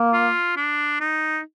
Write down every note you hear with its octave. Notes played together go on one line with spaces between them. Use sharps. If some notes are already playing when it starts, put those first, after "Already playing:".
Already playing: A#3
F4
D4
D#4